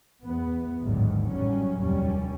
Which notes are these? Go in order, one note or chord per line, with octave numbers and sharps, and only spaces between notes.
E2 B3
A1 D#2 G#2 D3 D#3 F#3
F#2 A2 F#3 G3 C#4
F1 D#2 G3 C#4